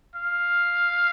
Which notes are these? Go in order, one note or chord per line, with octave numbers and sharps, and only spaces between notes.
F5